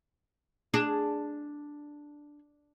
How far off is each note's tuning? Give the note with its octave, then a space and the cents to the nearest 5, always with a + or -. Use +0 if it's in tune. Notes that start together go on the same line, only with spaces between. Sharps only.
D4 +0 G#4 +0